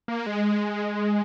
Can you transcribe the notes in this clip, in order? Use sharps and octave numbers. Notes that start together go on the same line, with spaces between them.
A#3
G#3